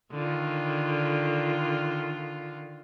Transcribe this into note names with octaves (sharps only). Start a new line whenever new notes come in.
D3 D#3 F4